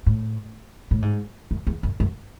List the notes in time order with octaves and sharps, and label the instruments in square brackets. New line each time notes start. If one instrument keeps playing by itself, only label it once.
[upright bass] A2
A2
G#2
F#2
E2
F#2
F#2